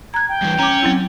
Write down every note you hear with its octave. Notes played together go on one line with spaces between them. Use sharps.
A#5 F#6 G#6
G5
G2 E3
C#4 A#5 D6
F#3 C4 E4